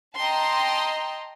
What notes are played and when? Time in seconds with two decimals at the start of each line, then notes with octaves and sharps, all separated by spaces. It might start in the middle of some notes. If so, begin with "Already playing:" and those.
0.17 D#5 G5 A5 A#5 C6